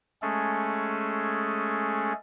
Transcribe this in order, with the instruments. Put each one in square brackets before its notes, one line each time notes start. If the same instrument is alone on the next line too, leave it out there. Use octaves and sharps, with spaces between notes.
[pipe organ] G#3 A3 C#4 G#4 A4